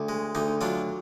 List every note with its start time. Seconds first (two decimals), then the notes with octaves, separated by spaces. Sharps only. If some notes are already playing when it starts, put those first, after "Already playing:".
Already playing: D2
0.09 G#3
0.35 D2 D#4
0.61 F#3 D4 F4